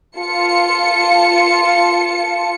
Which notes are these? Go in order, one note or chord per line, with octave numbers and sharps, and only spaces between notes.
F4 A5 C#7